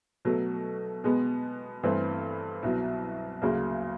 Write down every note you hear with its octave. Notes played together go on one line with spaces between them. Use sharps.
B2 F#3 A3
B2 G#3 B3
G2 E3 A3 C4
C2 B2 F#3
D2 C#3 F#3 A#3